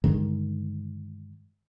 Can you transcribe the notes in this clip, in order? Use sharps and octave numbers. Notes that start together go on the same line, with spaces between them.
G2 D3 D#3 G#3